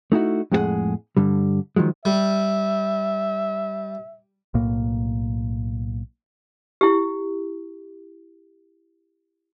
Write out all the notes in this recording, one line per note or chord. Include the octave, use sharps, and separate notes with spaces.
A3 D#4 E4 F#4
F2 A2 G#3 F#4 G#4 F#5
G2 D3 G3
D#3 F3 F#3 G#3
G3 E5
B1 A2 A#3
E4 G4